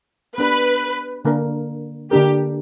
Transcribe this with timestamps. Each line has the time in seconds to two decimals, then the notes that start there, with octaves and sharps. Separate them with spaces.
0.37 B3 D4 G4 B4
1.25 D3 A#3 D4 A#4
2.11 D3 A#3 D4 G4 A#4